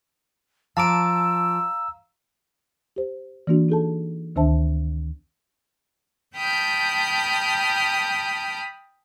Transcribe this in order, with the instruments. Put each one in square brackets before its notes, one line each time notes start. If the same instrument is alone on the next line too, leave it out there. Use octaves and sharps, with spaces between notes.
[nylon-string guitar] F3 [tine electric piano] F5 A#5 [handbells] A5 D6 D7 [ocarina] E6
[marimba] G4 C5
E3 A#3 D4 F#4
D#4 G#4 A4 A5
D2 D#3 D4 C5 E5 A5
[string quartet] G5 A5 B5 D#6 F6 G6